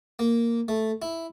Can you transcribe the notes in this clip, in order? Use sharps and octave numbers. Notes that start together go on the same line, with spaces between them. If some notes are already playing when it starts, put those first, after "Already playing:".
A#3
A3
E4